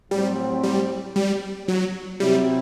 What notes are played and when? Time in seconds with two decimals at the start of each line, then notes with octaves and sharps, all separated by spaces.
0.11 A2 F#3 G3 C4
0.63 G3
1.16 G3
1.68 F#3
2.20 C3 F#3 G3 C4 E4